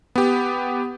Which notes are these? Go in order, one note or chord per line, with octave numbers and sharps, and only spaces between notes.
B3 G4